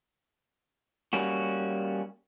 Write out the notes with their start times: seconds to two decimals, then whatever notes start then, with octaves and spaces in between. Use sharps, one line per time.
1.13 G3 A#3 C#4 F#4